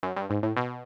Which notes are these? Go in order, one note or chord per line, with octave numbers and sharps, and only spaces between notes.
F#2
G2
G#2
A2
B2